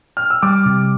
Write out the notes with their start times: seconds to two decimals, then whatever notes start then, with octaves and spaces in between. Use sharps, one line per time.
0.17 F6
0.30 E6
0.43 G3 D6
0.66 C3